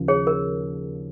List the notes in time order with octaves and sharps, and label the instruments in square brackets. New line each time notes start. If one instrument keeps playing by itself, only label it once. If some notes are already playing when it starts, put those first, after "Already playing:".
Already playing: [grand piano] D#2 C#3 F3
[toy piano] G#4 C#5
A#4